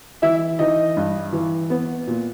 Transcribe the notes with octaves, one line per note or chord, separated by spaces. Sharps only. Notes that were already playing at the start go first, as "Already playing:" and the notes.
E3 E4 E5
E3 D#4 D#5
G2
E3
B3
A#2